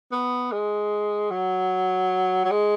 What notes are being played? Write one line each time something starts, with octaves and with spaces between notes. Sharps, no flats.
B3
G#3
F#3
F#3
G#3